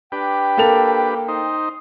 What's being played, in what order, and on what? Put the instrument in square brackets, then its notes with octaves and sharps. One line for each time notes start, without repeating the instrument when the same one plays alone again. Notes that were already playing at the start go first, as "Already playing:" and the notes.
[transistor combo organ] D4 G4 B4 [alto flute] G5
[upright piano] A#3 A4 F7
[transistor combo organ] D#4 C5